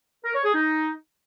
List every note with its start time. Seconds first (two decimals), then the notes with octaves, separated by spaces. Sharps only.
0.24 A#4
0.34 C#5
0.44 G#4
0.54 D#4